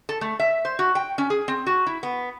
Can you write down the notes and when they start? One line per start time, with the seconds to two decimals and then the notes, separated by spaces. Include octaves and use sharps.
0.09 A4
0.21 A3
0.40 E5
0.65 C5
0.79 F#4
0.95 G5
1.18 C#4
1.30 G#4
1.48 C4
1.66 F#4
1.87 E4
2.03 B3